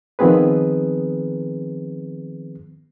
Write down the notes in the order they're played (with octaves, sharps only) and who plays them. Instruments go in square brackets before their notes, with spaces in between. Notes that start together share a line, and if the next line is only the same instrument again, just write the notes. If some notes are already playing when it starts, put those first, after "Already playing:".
[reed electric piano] D#3 F3 B3 C4 G#4 B4